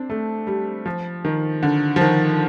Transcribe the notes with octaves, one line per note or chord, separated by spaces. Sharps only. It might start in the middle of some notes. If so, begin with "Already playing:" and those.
Already playing: C4 D4
A3
G3
F3
D#3
D3
F3
D#3